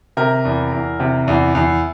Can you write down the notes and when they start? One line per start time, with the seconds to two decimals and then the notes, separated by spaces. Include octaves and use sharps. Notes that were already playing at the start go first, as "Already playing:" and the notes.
0.17 C3 A#4
0.45 E2
0.72 E2
1.00 C3
1.28 E2
1.55 E2